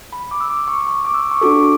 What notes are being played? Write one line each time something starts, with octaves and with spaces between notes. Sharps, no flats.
B5
D6
E6
D6
C#6
C#6
D6
E6
C#6
D4 F#4 A4 D6